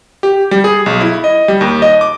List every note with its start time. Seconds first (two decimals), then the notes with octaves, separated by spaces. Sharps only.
0.23 G4
0.51 G3
0.64 G#4
0.86 B1
1.01 E4
1.24 D#5
1.48 G3
1.61 D#2
1.82 D#5
2.01 D6